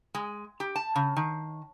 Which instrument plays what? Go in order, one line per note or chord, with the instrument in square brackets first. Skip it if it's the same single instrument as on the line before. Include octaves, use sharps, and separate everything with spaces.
[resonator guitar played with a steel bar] G#3
G4
A5
C#3
D#3